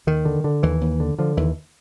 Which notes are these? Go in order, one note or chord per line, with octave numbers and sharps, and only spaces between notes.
D#2 D#3
D3
D3
D#2 E3
D#2
D3
D3 F3
D#2 E3